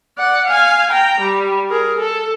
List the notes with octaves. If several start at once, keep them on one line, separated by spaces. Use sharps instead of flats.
D5 F#5
F5 G#5
G5 A#5
G3
G#4 A#4
A4